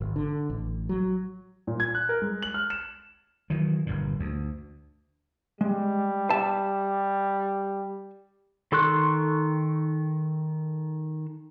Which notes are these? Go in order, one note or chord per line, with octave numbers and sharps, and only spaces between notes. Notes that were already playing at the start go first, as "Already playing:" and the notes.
G#1
D3
A1
F#3
A#2
G#6
F#6
A#4
G#3
F#7
F6
E7
D#3 E3 F#3
G1 G2 A#2
D2
G3 G#3
E5 A5
D#3 A4 C6 C#6 F#6